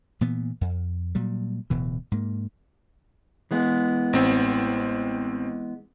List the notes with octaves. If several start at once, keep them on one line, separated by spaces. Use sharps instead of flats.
A#2 E3 B3
F2
A#2 F#3 G3
D1 B2 E3
G#2 A#3
E3 G#3 B3
A1 C4